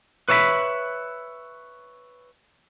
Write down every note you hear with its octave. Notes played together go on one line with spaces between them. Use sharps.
B4 C#5 E5 A5 B5